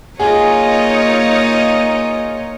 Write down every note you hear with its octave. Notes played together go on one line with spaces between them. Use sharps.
A#3 D#4 F4 G#4 C#5 D#5